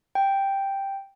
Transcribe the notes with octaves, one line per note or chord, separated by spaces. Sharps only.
G5